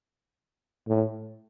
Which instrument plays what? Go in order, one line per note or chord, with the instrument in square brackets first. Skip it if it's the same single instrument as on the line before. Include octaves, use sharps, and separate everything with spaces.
[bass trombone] A2